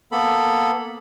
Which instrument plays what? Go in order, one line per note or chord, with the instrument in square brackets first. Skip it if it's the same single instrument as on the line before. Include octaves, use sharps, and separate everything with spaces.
[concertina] A#3 B3 A4 B5